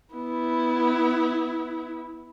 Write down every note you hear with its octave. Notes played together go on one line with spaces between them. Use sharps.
B3 E4